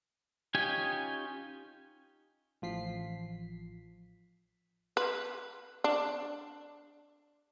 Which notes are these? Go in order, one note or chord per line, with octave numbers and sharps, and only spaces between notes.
C#4 D#4 F4 G4 G#5
A1 F3 B6 C7
B4
D4